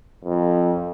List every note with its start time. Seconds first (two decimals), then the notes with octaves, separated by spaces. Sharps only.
0.24 F2